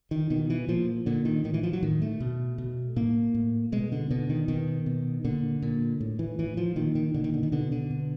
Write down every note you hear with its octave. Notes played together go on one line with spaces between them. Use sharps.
D#3
B2 D#3
E3
A#2 F3
A#2 D3
D#3
A2 D#3
E3
F3
F#3
A2 D#3
A3
B2
B2
A2 A#3
A2
B2 G#3
D3
B2 D3
D#3
B2 D#3
B2
A#2 D3
A#2
A2
E3
A2 E3
F3
A#2 D#3
D#3
A#2 D3
D#3
D3
D#3
B2 D3
D3
B2